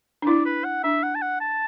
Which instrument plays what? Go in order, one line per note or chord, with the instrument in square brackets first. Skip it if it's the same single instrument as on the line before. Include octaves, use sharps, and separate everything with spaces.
[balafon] D4
[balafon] E4 [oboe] D5
[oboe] B4
F#5
[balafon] D4 [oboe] E5
[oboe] F#5
A5
F#5
A5